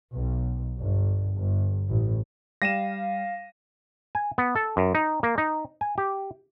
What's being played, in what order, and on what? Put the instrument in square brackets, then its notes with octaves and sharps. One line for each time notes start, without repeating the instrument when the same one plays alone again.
[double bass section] B1
G1
G1
A1
[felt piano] G3 [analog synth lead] F5 [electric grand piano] A#6 D#7 E7
[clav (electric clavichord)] G#5
B3
A4
F#2
D#4
A#3
D#4
G#5
G4